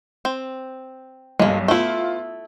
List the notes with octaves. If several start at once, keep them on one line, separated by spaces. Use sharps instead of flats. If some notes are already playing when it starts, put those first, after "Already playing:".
C4
B1 G2 G#3 A#3
A3 B3 E4 F4